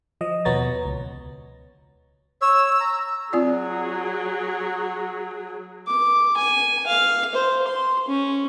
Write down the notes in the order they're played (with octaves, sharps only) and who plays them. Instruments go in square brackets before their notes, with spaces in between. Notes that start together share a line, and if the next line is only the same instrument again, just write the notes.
[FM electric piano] F3 D#5
D#2 B2 B3 C#5 A#5 A6
C#2
[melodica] C#5 [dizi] E6
[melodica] A#5
[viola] F#3 G#4 [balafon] C4 F4 D5
[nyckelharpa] D6
G#5
F5
C5
C6
C#4